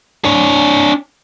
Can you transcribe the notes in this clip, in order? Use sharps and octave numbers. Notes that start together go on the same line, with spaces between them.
D4 C#5